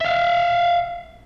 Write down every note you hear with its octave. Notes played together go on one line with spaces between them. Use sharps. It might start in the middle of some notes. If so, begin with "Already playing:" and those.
E5 F5